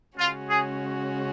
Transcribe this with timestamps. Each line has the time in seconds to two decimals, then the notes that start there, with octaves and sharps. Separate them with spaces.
0.18 C#3 G#3 C#4 F4 F#4
0.49 G#4